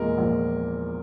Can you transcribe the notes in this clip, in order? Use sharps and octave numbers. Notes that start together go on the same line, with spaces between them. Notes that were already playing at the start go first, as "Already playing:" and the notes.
Already playing: E2 A#2 G#3 A#4
A#1